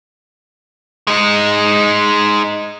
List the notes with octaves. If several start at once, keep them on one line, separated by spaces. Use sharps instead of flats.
G#3 D#4